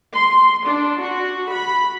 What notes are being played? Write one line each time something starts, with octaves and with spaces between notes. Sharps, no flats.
C6
D4
F#4
B5